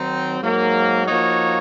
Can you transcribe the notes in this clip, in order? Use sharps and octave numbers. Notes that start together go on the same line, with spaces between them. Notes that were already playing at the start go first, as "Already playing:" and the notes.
Already playing: D#3 F#3 C4 D#4
G#2 F#3 A#3
F3 A#3 D#4 F#4 C#5